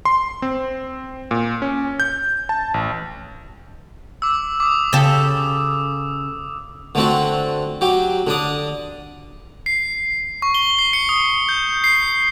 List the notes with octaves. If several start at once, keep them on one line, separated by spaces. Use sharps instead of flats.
C6
C4
A#2
C#4
G6
A5
A1
D6 E6
D6 D#6
C#3 G4 A4
D3 A3 C4 F#4
F#3 G4
D3 D4 D#6
C7
C#6
G7
C7
C#7
D#6
G6
C7